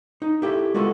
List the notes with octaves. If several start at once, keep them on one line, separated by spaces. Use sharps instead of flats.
D#4
E4 G4 A4 E5
G#3 B3 F4 F#4 G#4 A4